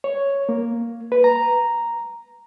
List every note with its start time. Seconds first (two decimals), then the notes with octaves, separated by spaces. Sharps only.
0.04 C#5
0.49 A#3
1.12 B4
1.24 A#5